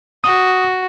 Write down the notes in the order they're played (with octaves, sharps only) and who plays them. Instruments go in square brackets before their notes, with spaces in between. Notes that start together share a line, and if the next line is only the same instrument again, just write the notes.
[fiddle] F#4 [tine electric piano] D#6